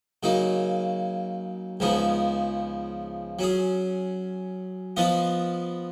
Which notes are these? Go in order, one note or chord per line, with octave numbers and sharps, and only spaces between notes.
C#3 F#3 A#3 D#4
C#2 C#3 F3 B3 D#4
F#3 C#4 G#4
F3 B3 F4 B4 D#5